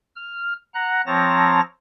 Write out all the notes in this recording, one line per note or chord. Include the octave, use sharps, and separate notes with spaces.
F6
F#5 A#5 F#6
F3 C4 C#5 A5 A#5 A#6